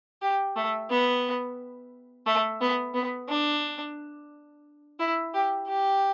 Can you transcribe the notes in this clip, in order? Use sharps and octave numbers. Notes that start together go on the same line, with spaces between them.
G4
A3
B3
A3
B3
B3
D4
E4
G4
G4